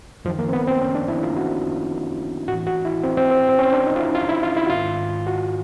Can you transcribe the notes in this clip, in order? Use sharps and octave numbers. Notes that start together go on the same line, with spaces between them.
F#2 D#3 F3
A#3
C4
B3
C4
C#4
D4
E4
F4
F#4
A2 E3 F#4
F#4
E4
C4
C4
C4
C4
C#4
D4
D#4
F4
E4
F4
E4
F4
E4
F#4
G#2 D#3 F4
F#4